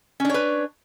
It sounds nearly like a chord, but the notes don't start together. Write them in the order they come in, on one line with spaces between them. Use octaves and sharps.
C#4 D4 C#5 B4